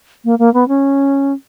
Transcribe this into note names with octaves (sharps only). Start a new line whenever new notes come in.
A#3
A#3
B3
C#4